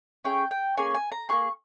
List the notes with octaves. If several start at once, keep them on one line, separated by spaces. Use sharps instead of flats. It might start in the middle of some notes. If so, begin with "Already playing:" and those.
C#4 E4 G#4 G5
G5
A#3 C#4 G#4 G#5
G#5
A#5
A#3 F4 G#4 C#6